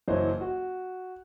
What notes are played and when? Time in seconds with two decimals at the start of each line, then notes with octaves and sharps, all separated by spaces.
0.08 F#1 E3 F#3 C5 C#5 D#5
0.41 F#4